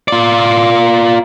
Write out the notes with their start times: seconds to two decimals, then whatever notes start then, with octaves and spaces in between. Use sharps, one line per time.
0.08 F4 D5